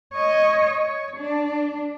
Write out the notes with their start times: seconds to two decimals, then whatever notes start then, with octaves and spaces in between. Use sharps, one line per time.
0.14 C#5 D#5
0.79 C#5
1.17 D4